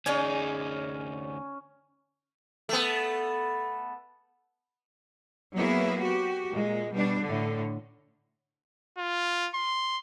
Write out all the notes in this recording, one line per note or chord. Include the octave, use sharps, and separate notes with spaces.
D2 C#4 D#4 G#4 C#5 D5 G#5
A3 B3
F#3 A#3 B3 E4 G#4
F#4 G4
A#2 G#3
B2 G3 D4
A2 D3
F4
C6